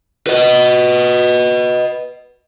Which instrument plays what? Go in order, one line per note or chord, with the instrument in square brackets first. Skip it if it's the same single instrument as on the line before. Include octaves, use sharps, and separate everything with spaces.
[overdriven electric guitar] B4 D#5